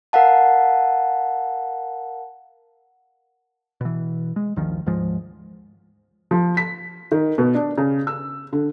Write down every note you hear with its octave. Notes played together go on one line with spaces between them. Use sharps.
A#4 F5 F#5 A5
B2 E3
G#3
G1 D2 D#3 F3
D2 G#2 F3 G#3
F3
B6
D#3
B2
D4
C#3
E6
D3